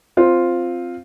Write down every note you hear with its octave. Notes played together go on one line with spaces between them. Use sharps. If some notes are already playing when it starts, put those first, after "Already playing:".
C4 F4